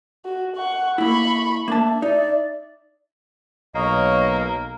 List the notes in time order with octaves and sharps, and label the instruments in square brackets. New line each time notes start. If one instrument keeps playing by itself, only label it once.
[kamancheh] F#4
F#5 C#6
[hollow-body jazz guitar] A#3 E4 [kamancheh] B5 C#6
[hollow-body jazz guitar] A#3 D4 A5 [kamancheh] E5
[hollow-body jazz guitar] D#4 [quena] D5
[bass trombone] B1 [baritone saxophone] A#3 [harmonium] C#5 D#5